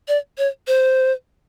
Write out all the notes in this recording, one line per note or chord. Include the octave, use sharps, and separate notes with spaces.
D5
C#5
C5